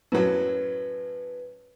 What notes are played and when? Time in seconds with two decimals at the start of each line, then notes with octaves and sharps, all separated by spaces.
0.12 F#2 A2 F#3 B4